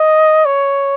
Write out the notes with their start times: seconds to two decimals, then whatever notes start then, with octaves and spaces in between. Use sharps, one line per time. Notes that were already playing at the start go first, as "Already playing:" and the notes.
Already playing: D#5
0.45 C#5